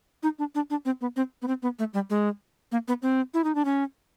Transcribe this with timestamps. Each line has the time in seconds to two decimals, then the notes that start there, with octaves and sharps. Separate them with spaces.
0.23 D#4
0.39 D4
0.55 D4
0.70 D4
0.85 C4
1.01 B3
1.16 C4
1.42 B3
1.47 C4
1.62 B3
1.79 A3
1.94 G3
2.10 G#3
2.72 A#3
2.88 B3
3.02 C4
3.34 E4
3.44 D#4
3.55 D4
3.65 C#4